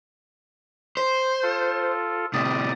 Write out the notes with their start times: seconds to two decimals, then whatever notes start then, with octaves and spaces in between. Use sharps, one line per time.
0.97 C5
1.43 F4 A4
2.34 A2 C3 D5 D#6